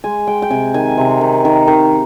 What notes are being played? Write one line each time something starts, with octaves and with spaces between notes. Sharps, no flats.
G#3 G#5
G#3 G5
G5
C3 G#5
D#3 G#5
C3
D#3
D#3
D#3